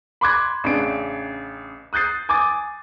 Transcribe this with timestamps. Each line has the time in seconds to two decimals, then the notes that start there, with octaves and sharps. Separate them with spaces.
0.21 B5 C6 D6 F#6 G#6
0.64 A1 C#3 D4 D7
1.93 D#6 F#6 G6 A6 C7
2.29 G#5 D6 D#6 A6